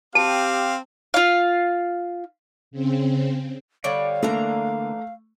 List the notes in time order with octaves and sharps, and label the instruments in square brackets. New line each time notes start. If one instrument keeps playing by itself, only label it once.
[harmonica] C4 [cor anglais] G4 [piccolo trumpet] F5 [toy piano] A5
[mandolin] F4 F5
[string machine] C#3 C4
[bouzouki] D3 G3 C#5 [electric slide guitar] D5 [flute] F5
[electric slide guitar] D3 A#3 [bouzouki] E3 D4 A#5 [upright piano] A3